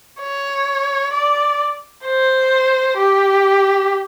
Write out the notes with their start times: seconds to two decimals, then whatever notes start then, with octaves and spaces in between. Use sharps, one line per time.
0.21 C#5
1.13 D5
2.05 C5
2.97 G4